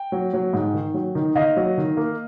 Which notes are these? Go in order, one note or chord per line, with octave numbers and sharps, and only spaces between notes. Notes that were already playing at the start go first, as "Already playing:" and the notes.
Already playing: G5
F#3
F#3
G#2
D#3
F#3
D#3
D#3 D#5 F5
F#3
D#3
A#3